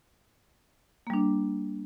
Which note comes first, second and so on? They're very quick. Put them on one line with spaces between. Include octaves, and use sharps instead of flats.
A#3 G3 D4